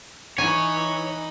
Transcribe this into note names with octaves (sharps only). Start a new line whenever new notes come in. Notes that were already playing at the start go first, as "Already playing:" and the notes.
E3 D#4 C#5 G#5 B5